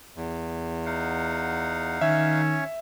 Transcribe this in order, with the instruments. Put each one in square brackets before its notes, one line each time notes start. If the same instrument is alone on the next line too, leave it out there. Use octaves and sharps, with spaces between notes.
[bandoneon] E2
[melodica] D#4 F5 F#5
[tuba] D#3 [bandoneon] C#4 C#5 [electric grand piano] E5